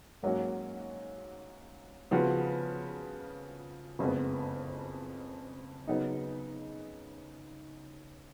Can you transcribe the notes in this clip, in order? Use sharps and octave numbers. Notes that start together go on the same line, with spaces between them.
G#2 F#3 A#3 C#4 F#4
C#3 F3 B3 F#4 B4
F#1 F2 C#3 G#3 B3
C#3 F#3 B3 D#4